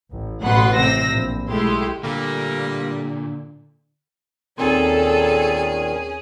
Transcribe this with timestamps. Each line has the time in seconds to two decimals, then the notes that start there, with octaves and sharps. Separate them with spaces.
0.12 A1
0.44 A1 B2 B4 F#5 C6
0.76 C3 C4 E6 A#6
1.09 A#1
1.49 B1 G#3 A3 E4 G4 C6
2.03 A#2 D3 G3 A3 A#3
4.58 D#2 A#2 D#3 C4 C#4 G#4 A4